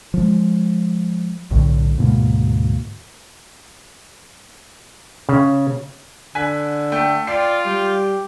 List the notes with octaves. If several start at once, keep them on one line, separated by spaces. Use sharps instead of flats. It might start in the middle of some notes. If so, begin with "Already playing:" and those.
F3 G#3
B1 A2 D3
D2 G#2 B2 A#3
C#3
D3 G#5 F#6 B6
A3 G5
F4 D5 G5 C7
G3 G4